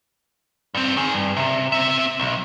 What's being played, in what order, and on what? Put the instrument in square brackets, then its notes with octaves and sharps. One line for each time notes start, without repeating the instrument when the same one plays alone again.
[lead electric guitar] G2 C4
D#3 G#4
G2
C3
C4 E5
B1